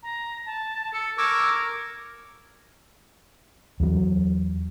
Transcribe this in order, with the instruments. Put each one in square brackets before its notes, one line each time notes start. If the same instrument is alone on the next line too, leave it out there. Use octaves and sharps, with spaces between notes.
[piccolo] A#5
A5
[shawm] A4 [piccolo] C#7
[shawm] A#4 [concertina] C#6 D6 E6 [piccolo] G#6
[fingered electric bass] E2 F#3